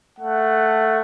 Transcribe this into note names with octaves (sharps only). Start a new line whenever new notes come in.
A3 F#5